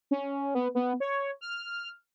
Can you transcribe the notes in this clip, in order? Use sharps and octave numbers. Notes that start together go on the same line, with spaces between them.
C#4
B3
B3
C#5
F6